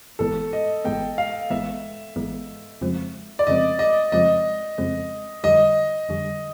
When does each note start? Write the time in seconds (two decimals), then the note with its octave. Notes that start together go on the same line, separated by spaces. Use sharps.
0.19 G#1 G#2 E3 G#3 B3 A4
0.53 D#5
0.85 G#1 G#2 E3 G#3 B3 G5
1.18 F5
1.50 G#1 G#2 E3 G#3 B3 E5
2.16 G#1 G#2 E3 G#3 B3
2.81 F2 C#3 F3 G#3 C4
3.39 D5
3.47 F2 C#3 F3 G#3 C4 D#5
3.79 D#5
4.12 F2 C#3 F3 G#3 C4 D#5
4.78 F2 C#3 F3 G#3 C4
5.44 F2 D3 G3 D#5
6.09 F2 D3 G3